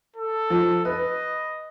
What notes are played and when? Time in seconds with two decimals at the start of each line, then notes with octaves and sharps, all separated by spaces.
0.16 A4
0.50 F3
0.85 B4 D#5